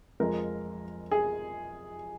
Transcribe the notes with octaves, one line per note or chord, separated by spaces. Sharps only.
F2 F3 G#3 A#4
G#4